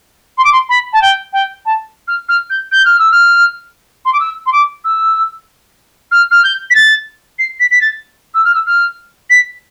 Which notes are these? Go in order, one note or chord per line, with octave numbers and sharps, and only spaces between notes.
C6
D6
C6
B5
A5
G5
G5
A5
F6
F6
G6
G6
F6
E6
F6
C6
D6
E6
C6
D6
E6
F6
F6
G6
B6
A6
C7
B6
B6
A6
E6
F6
E6
F6
B6